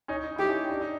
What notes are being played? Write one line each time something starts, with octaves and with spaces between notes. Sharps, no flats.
C#4 D#4
D#4
E4 G4
C#4 D#4
D4
D#4